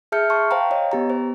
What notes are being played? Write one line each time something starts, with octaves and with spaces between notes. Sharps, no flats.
G#4 E5 A5 F6 G6 C#7
A5 C6 C#6
C5 F5 G5 A#5
C#5 D#5
B3 G4 A#5
C5